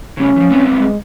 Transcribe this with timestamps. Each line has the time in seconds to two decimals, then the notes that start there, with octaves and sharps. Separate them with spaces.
0.17 C#3 G3 C#4
0.36 E3 F3
0.50 G3 B3 C4
0.78 G#3